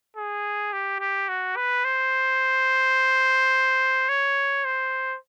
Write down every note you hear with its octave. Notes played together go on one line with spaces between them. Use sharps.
G#4
G4
G4
F#4
B4
C5
C#5
C5